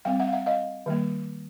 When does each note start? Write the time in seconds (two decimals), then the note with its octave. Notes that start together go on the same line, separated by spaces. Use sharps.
0.05 G3 C4 F5 G5
0.19 E5 F#5
0.28 F5
0.33 E5 F#5
0.46 D#5 F5
0.86 D#3 G3 A#3